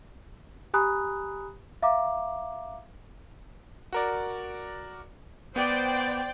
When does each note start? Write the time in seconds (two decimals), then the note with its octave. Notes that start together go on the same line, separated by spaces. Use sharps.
0.74 G4 G#5 A#5 B5 D#6 F#6
1.82 E5 F5 A#5 D6
3.93 F#4 A#4 D5
5.56 B3 C5 D5 G5